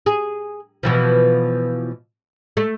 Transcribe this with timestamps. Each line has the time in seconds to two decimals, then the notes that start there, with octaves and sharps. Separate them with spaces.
0.06 G#4
0.83 B2 E3 F3
2.57 A3